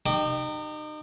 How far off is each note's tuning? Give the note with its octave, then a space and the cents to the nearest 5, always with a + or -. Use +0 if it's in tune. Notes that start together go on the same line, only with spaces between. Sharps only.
D#4 -35 G4 +0